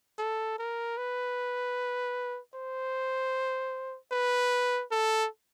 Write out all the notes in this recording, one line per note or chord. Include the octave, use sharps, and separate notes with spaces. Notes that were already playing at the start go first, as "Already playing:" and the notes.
A4
A#4
B4
C5
B4
A4